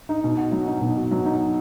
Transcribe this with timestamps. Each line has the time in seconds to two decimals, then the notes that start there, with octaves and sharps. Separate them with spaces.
0.09 D#4
0.24 B2
0.37 F#4
0.52 F#3
0.67 D#4
0.81 B2
0.96 F#4
1.11 F#3
1.26 D#4